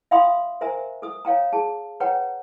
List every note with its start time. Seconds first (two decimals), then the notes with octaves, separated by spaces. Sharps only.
0.11 E5 F5 G5 B5 C6 D#6
0.61 A#4 C5 E5 G#5 A#5
1.02 A4 D#6
1.25 C#5 F5 G5 A#5
1.53 G#4 A5
2.00 B4 C#5 F#5 G5 A#5